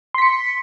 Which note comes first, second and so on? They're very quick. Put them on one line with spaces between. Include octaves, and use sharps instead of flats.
C6 B6 C#7